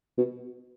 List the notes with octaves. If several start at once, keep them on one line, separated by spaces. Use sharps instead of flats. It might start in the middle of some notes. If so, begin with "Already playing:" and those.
B2